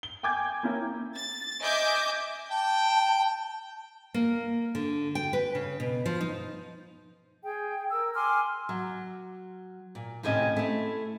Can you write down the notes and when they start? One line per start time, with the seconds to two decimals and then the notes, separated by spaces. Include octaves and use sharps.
0.03 G7
0.23 G5 G#5 D6 G6 G#6
0.63 A#3 C#4 E4 A#4
1.14 A6
1.62 D#5 E5 G#5 D6 G6
2.51 G5 A5
4.14 A#3
4.75 D3
5.15 G5
5.33 B4
5.55 C#3
5.80 B2
6.06 F3
6.21 D#4
7.44 G#4 G5
7.91 A#4 E6
8.14 G#5 C6 D6 F6
8.69 F#3
9.95 A#2
10.23 D#2 A2 C3 C#4 D#5
10.56 A3 E4